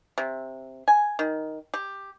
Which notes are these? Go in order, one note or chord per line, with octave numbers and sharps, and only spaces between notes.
C3
G#5
D#3
G4